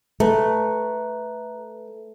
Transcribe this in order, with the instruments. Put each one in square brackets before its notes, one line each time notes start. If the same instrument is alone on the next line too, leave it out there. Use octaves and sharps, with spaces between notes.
[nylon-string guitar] A3 [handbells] B4 A#5